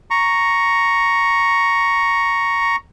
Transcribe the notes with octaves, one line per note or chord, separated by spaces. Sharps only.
A#5 C#6